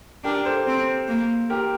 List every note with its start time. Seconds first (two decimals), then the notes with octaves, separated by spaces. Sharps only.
0.24 D4 G4 A#4
0.45 A4 C5
0.67 C4
1.08 A#3
1.50 G4 A#4